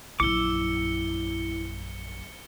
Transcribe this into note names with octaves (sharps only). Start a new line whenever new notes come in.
A#1 F#2 E4 D6 E6 C#7 G7